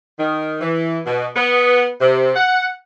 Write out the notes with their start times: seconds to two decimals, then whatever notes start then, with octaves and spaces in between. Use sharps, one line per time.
0.19 D#3
0.61 E3
1.05 B2
1.36 B3
2.00 C3
2.35 F#5